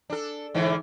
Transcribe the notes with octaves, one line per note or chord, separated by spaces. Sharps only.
D4 A4
G#2 D3 E3